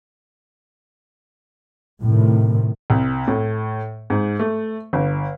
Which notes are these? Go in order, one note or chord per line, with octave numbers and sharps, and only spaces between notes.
A2 C3 D#3
C2
A2
G#2
A3
G1